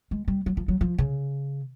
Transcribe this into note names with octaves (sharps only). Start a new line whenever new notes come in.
G#3
G3
F#3
F3
F#3
F3
C#3